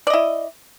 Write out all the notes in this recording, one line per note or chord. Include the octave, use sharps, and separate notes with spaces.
E4 D5 D#5